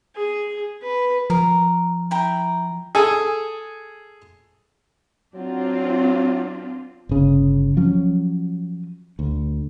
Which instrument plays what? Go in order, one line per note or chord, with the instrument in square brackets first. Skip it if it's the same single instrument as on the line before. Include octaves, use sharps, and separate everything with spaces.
[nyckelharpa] G#4
B4
[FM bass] F3 [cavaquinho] A#4
[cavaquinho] E4 G5 A#5
[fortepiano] G#4 A4 G#5
[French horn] F#3 [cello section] C4 D4 F4
[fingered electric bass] G1 C#3
F3 F#3 C#4
D2